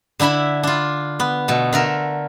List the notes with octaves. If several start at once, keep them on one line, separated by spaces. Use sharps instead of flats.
D3 D4 E4 E5 B5
D4 F4
B3
B2 A3
D3 A3 A#4